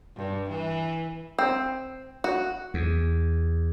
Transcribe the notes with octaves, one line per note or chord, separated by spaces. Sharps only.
G2
E3
C4
F#4
E2